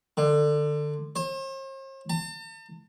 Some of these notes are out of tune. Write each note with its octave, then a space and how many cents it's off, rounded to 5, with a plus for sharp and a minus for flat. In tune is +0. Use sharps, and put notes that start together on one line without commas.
D3 +20
C5 +45
A5 +40